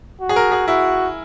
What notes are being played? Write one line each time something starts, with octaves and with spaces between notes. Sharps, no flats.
F#4
G#4
A#4
G#4
E4 F#4